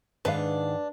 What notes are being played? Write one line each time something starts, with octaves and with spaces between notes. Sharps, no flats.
G#2 D#3 D4 B4 F5